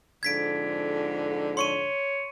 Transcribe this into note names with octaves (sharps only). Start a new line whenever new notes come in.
F2 G#2 D3 G#6 B6 D7
C#5 C6 C#6 D#7